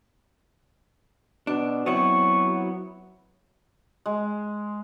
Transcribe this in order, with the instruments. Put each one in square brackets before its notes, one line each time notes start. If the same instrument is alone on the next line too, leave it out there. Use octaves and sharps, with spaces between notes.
[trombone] B2 [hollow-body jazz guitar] D4
[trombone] F#3 [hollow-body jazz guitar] B3 C4 E4 [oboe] C#6
[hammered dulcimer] G#3